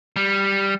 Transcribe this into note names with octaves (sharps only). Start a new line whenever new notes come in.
G3